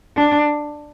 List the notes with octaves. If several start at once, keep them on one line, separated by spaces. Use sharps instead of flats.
D4